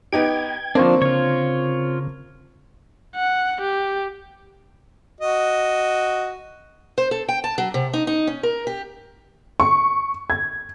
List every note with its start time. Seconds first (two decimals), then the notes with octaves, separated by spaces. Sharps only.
0.13 B3 D#4 G4 G5 G#6
0.75 D3 F3 A#3 C4 D4 C5 C#6
1.02 C#3 F4 C#5
3.15 F#5
3.61 G4
5.21 F#4 D#5
6.98 C5
7.11 A4
7.28 G5
7.44 A5
7.58 F#3
7.74 C3
7.93 D#4
8.07 D#4
8.27 C#4
8.43 A#4
8.67 G4
9.60 C#6
10.30 G#6